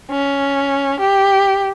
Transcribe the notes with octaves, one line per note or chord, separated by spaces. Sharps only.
C#4
G4